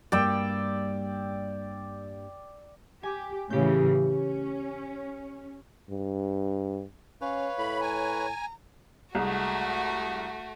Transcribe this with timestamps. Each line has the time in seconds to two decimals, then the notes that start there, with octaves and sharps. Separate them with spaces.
0.12 G2 G3 A#3 D5 G5 E6
3.03 G4 G#5
3.50 A2 C#3 E3 G4 G6
4.00 C#4
5.90 G2
7.21 C#4 B4 C#5 F5
7.58 A2 B5
7.81 G#5 A#5
9.15 C2 G#3 A3 F#4